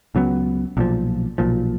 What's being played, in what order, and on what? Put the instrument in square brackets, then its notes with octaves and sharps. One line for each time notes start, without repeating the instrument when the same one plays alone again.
[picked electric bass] C#2 C#3 F#3 B3
B1 A#2 F3
B1 A#2 F3